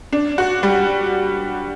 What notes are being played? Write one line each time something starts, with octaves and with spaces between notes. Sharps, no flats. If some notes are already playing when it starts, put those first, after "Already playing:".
D4
F#4
G3